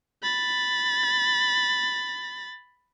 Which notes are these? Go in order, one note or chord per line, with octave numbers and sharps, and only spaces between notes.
B5 A6